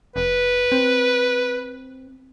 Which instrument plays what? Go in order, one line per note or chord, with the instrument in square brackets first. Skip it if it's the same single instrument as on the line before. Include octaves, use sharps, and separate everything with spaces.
[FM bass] F1 [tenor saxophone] B4
[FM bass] C4